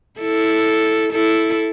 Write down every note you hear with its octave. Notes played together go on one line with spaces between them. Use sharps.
E4 A4
E4 A4